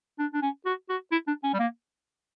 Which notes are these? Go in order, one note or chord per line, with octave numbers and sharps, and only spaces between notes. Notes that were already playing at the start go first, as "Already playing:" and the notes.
D4
D4
C#4
F#4
F#4
E4
D4
C#4
G3
A#3